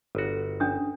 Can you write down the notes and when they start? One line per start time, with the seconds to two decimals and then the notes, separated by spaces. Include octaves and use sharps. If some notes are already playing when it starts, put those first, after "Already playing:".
0.15 G1 F#4
0.60 C#4 D4 D#6